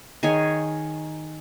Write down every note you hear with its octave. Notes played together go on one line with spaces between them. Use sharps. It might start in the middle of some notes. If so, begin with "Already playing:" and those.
D#3 G#4 C#5 G#5